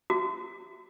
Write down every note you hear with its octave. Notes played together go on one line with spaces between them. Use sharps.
F#4